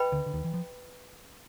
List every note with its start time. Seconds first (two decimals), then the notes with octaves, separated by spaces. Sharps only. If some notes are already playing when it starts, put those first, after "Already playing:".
Already playing: B4 D#5 G5 B5
0.12 D2 D3
0.26 D3
0.34 D#2 D#3
0.44 E3
0.54 F3